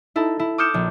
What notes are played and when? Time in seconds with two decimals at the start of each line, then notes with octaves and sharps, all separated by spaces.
0.16 D#4 E4 A4
0.39 E4
0.58 D6 D#6 F6 G6 C#7 E7
0.74 A#1